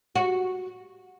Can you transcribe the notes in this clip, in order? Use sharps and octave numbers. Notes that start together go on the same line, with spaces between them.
F#4